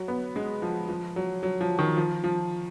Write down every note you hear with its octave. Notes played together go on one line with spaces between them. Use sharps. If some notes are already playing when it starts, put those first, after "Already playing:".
Already playing: F#3
B3
G#3
F3
F3
F#3
F#3
F3
D#3
F3
F3